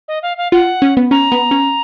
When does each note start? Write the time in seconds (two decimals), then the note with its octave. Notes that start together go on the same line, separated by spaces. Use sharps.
0.08 D#5
0.23 F5
0.38 F5
0.52 F4 F#5
0.82 C#4
0.97 B3
1.11 C#4 A#5
1.32 B3
1.51 C#4